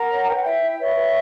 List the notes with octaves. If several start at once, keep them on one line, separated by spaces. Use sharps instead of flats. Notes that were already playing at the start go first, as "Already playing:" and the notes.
Already playing: A#4 F#5 A#5
C#5
B4 G5
F#5
E4 E5 G5
E4
B4 C#5 E5
B4